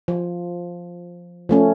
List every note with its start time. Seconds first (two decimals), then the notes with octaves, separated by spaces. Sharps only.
0.08 F3
1.49 F3 A3 C#4